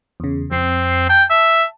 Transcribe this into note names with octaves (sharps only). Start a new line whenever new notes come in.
E2 C#3
F2 C4 C7
G5 A5
E5